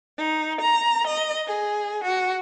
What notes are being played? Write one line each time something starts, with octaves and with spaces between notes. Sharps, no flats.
D#4
A#5
D#5
G#4
F#4